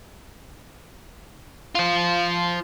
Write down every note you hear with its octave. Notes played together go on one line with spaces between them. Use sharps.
F4 C5